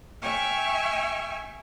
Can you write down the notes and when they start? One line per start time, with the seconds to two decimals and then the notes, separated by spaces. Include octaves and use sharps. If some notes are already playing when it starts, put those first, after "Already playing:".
0.21 E5 G5 G#5 C#6 F6